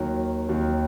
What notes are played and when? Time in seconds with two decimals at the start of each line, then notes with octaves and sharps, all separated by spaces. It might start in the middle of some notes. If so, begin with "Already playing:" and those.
Already playing: D#2 D#3 F#3
0.49 D#2 D#3 F#3